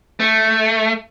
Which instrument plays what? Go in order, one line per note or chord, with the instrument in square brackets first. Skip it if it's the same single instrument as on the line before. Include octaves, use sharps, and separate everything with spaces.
[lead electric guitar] A3